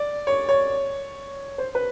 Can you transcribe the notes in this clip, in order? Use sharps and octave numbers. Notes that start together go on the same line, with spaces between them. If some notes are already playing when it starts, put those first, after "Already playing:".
Already playing: D5
C#5
C#5
C5
B4